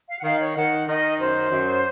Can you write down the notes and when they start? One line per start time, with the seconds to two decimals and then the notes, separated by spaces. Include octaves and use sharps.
0.09 F5
0.20 F#5
0.24 D#3 F5
0.40 C#5
0.56 D#3 F#5
0.88 D#3 D#5
1.19 F#2 C5
1.51 F#2